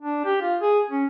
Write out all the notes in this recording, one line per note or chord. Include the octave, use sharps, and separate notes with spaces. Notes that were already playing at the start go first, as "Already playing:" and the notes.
D4
G4
F4
G#4
C#4